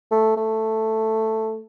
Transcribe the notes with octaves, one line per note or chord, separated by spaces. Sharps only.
A3
A3